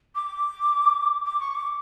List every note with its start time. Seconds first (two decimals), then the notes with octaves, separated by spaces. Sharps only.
0.15 D6
1.25 D6
1.40 C#6
1.54 D6